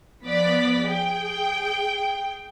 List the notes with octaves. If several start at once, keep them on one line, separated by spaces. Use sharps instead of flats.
F3 B3 D5 B6
G#4 G5